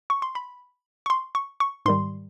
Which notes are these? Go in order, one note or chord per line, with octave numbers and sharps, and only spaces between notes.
C#6
C6
B5
C#6
C6
C#6
C#6
G#2 D#3 G3 C6